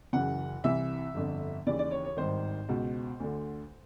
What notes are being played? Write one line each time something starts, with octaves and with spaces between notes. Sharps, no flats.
F#1 F#2 C#3 E3 F#5
C2 C3 E3 E5
G1 F2 D3
D#2 C#3 E3 D5
D5
C#5
C#5
G#1 G2 D#3 C5
C#2 B2
D2 D3